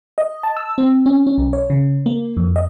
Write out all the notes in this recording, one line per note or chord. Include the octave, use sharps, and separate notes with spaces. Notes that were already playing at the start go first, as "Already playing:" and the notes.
D#5
A5
E6
C4
C#4
C#4
B1
C#5
C#3
A#3
F2
D#5